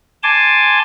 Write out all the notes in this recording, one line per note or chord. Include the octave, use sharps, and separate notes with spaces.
G#5 A5 C6 D6